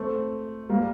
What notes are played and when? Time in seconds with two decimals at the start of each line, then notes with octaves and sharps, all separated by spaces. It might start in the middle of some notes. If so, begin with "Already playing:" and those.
Already playing: A3 C4
0.69 G3 A#3